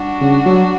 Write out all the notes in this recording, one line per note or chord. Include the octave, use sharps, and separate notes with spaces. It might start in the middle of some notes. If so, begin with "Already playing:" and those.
Already playing: G3 D4 F#4
C#3
F#3